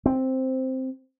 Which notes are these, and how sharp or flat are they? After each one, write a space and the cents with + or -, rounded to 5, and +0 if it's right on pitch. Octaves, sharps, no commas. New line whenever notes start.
C4 +0